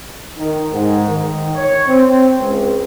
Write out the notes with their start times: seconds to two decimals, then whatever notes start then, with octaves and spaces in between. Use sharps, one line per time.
0.37 D#3
0.72 G#2
1.07 D#3
1.54 C#5
1.88 C4
2.39 C#2